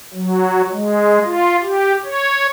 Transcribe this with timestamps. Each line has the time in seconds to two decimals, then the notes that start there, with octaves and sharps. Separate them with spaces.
0.13 F#3
0.73 G#3
1.24 F4
1.62 G4
2.05 C#5